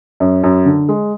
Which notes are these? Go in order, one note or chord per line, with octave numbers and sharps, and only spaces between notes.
F#2
F#2
D3
G#3